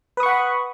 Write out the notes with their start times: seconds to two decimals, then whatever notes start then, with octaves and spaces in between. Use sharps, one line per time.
0.17 B4
0.20 D#6
0.23 C#6
0.26 F#5
0.29 B5